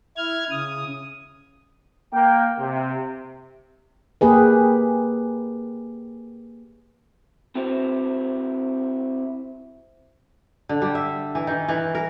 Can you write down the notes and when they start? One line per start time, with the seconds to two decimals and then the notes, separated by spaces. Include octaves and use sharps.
0.17 E4 F6 G#6
0.50 C#3 D#6
2.13 A#3 G5
2.59 C3
4.21 A#3 G4 G#4 B4
7.55 C4 E4 F#4 G4 C5
10.69 D3
10.82 G3
10.95 E5
11.35 E3
11.47 D#3
11.68 E3
11.95 A#4